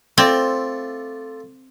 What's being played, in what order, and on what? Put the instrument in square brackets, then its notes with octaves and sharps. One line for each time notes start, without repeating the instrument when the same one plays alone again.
[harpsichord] A3 F4 D5 [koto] C4